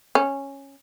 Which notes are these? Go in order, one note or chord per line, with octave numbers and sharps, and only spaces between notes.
C#4